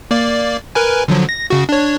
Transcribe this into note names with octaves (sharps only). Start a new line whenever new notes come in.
A#3 D5
A#4 B4 G#5
D3 F3 F#3
A#6
C#3 F#4
D4 C#5